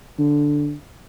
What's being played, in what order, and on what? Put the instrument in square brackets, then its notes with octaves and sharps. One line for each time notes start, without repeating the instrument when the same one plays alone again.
[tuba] D3